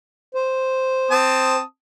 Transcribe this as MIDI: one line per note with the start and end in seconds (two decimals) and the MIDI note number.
0.35 1.56 72
1.11 1.62 60
1.11 1.62 81
1.11 1.62 87